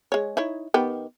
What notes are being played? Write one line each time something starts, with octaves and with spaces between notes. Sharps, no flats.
G#3 C#5
D#4 E4 C#5
D#3 B3 G4